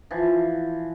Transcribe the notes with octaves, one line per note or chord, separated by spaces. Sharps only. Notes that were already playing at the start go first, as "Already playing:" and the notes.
E3 F3